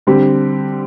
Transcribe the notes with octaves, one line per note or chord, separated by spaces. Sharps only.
D3 G3 C4 G4